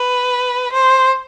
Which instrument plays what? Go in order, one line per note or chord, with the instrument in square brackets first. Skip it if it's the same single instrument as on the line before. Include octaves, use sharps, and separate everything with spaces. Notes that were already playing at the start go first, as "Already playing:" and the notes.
Already playing: [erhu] B4
C5